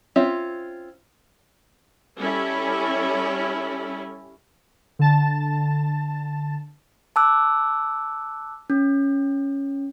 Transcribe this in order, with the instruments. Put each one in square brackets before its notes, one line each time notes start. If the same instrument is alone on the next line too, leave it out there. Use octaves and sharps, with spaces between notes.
[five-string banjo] C4 C#4 F4 E5
[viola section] G3 C#4 E4 A4
[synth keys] D3 A5 A6
[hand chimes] A5 D6 E6 F#6
C#4